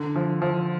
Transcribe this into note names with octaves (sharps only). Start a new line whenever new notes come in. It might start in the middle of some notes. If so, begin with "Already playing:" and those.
Already playing: D3
F3
F3